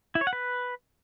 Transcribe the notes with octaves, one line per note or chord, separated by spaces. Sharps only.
E4
C#5
F#5
B4